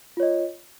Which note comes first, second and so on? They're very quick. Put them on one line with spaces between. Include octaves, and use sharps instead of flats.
F4 C#5 D#5